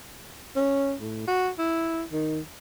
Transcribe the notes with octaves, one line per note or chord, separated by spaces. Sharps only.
C#4
A2
F#4
E4
D#3